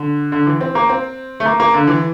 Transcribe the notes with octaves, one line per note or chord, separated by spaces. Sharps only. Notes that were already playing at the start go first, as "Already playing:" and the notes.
Already playing: D3
D3
E3
C4
A#3
C4
A3
A#3
A#3
D3
E3